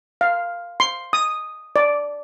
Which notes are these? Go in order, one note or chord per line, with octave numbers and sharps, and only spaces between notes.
F5
C6
D#6
D5